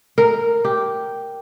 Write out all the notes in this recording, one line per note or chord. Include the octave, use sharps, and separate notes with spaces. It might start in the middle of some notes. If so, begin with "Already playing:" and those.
A#4
G4